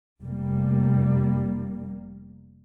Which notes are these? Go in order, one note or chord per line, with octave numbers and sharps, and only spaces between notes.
F1 G3 A#3